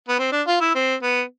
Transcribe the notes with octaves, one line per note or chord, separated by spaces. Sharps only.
B3
C4
D4
F4
E4
C4
B3